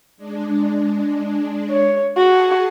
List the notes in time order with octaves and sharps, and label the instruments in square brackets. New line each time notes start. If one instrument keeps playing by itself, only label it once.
[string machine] G#3 D4
[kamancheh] C#5
[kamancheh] F#4 [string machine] G#4 A5